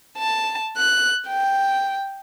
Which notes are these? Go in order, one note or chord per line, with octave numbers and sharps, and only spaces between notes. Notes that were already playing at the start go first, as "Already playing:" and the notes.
A5
F#6
G5